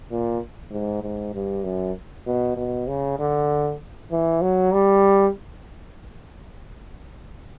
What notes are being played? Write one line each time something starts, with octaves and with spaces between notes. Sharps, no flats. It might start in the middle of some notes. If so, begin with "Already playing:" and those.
A#2
G#2
G#2
G2
F#2
B2
B2
C#3
D3
E3
F#3
G3